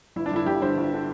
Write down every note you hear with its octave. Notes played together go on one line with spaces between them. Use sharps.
G1 E4
D4
G2 D3 E4
G1 G4
G2 D3 C5
G1
D3